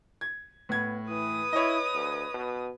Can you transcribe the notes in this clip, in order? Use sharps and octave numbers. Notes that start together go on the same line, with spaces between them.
G#6
A2 B3 G#6
E3 B4 D#6
E4 C#5 D#5
D2
B2